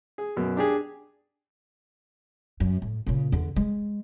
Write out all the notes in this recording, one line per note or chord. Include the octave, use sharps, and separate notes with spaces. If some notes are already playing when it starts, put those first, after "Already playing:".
G#4
F#2 B2
D4 G4 G#4
F#2
A2
A#2 C#3
E2 D3
G#3